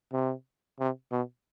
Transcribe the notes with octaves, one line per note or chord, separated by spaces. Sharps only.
C3
C3
B2